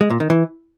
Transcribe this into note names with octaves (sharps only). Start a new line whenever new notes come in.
G#3
A#2
D#3
E3